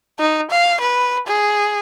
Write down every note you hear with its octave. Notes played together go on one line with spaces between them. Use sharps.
D#4
F5
B4
G#4